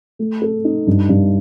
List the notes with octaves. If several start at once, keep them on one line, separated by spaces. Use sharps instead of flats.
A3
A4
D#4
G2
G2